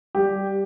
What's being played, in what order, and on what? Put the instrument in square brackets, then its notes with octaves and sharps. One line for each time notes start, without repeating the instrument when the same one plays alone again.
[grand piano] G3 G4